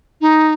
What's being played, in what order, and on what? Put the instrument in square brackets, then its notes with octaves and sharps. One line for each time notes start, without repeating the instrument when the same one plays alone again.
[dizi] D#4